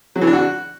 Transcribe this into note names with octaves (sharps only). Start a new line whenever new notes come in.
F#3
E3
D4
F#4